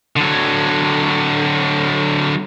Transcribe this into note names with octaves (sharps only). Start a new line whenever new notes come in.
D3 F#3